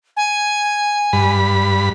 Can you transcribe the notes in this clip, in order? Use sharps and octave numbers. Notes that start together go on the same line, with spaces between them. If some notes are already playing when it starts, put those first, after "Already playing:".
G#5
G2 B5